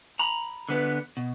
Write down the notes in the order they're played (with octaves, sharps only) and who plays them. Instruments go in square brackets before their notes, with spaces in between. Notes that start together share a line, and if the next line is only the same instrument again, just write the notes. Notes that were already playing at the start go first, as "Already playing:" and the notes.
[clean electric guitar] A#5 B5
D3 B3 B4
B2